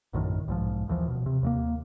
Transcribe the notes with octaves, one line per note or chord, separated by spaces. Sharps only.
A#1 F#2 A2 D#3
B1 G#2 F3
A#1 D#2 E3 F3
D#1 B2
C3
D#2 A3 A#3